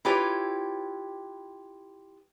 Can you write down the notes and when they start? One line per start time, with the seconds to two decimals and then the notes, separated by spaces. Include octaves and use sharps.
0.05 E4 F4 G4 B4 C#5